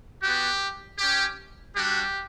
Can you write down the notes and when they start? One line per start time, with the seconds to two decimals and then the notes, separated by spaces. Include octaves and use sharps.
0.22 B3 F#4 G4
0.98 C#4 G4
1.74 G3 D4 F#4 G4